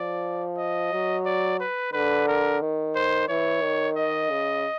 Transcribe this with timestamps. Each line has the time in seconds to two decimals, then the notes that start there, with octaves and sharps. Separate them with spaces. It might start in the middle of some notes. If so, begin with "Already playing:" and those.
Already playing: F3 D5
0.58 D#5
0.92 F#3
1.26 D5
1.60 B4
1.93 D3 B4
2.28 A#4
2.61 D#3
2.95 C5
3.28 E3 C#5
3.62 D#3
3.97 D#5
4.31 C#3